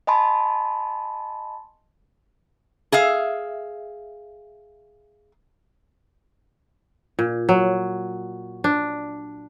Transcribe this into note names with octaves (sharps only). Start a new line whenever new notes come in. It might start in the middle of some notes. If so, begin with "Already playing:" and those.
D#5 G#5 A5 B5 C6
G#4 E5 F5
A#2
F#3
D4